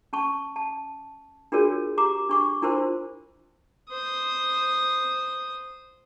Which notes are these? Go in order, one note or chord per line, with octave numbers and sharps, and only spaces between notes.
C#4 A5 C#6
A5
D4 F4 F#4 G#4 A#4 C#5
G4 A#5 D6
D4 C#6 D6
D4 E4 F4 A#4 C5 C6
C5 D#6